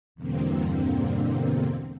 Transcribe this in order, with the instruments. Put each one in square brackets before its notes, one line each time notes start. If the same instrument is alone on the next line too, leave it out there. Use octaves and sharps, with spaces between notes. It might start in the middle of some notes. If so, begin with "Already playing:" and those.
[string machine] E2 G2 B2 D3 A#3 C4